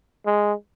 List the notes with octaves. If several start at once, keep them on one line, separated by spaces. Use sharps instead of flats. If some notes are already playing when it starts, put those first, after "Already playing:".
G#3